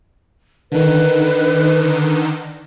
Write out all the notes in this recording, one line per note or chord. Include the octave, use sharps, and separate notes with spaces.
D3 D#3 B4